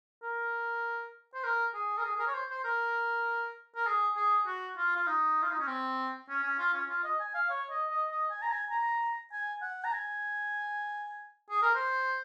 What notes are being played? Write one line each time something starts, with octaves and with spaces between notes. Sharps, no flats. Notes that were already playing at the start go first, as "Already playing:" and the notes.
A#4
C5
A#4
G#4
A#4
G#4
G#4
A#4
C#5
C5
C5
A#4
A#4
G#4
G#4
F#4
F4
F4
D#4
F4
D#4
C#4
C4
C#4
C#4
F4
C#4
F4
D#5
G#5
F5
C#5
D#5
D#5
D#5
G#5
A#5
G#5
A#5
G#5
F#5
A#5
G#5
G#4
A#4
C5